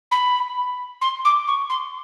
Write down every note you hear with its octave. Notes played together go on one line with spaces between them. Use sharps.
B5
C6
D6
C#6
C6